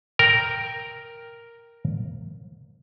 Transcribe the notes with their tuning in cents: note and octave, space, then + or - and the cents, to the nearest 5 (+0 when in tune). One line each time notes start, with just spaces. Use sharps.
A#4 +0 G5 +0